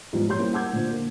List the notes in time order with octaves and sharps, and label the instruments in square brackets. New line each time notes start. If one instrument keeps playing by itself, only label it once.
[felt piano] E2 G#2 F3 G3
A#2 G3 G4 C#5 C6 G6
A#3 C#4 E4 C5
F#5 A5 D6 E6 G6 G#6
A#2 D3 C5
A#3